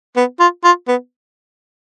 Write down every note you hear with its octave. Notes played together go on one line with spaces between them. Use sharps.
B3
F4
F4
B3